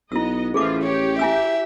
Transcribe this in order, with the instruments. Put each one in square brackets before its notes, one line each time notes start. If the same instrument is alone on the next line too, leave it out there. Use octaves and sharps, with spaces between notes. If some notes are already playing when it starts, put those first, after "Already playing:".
[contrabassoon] B1 [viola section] B3 D#5 [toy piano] E4 E6
[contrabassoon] A1 [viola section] E3 F3 F4 [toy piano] G#4 A4 D6
[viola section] G4 [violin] C#5
[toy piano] E4 G#5 E6 [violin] E5